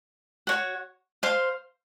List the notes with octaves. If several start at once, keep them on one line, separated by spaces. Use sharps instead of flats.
F#4 C#5 F#5
C5 F5 C6